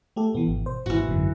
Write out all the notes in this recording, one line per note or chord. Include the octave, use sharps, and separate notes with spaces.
A3 G4 A4
B2 E3 B3
G#1
C5
G#1 A#2 E3 F#4
G#1 F#2 D3 C4